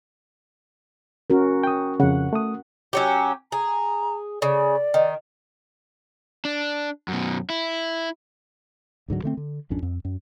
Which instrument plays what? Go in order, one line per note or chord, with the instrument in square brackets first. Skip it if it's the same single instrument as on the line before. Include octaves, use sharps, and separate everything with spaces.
[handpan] C#4 F#4 A#4
[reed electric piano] G5 D#6
[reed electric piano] F2 C#3 [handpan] F#5
[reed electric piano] A3 D#6
[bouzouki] F#3 C#4 G4
[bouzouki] G#4 [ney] A#5
[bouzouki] C#3 [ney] D5
[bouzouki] D#3
[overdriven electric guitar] D4
F#2 B2
E4
[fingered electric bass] D1 G#2 D3 F#3
D3 A3 C4
D3
G#1 F2 C#4 D4
F2
F#2